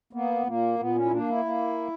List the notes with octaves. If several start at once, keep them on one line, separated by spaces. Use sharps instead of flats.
A#3 B3
A#2 A#3
A#2 B3
C#4
E4
A#3 D4
E4
A#3